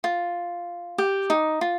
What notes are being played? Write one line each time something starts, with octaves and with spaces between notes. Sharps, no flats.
F4
G4
D#4
F4